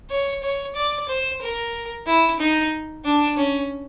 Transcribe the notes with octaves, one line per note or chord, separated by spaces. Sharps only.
C#5
C#5
D5
C5
A#4
E4
D#4
D4
C#4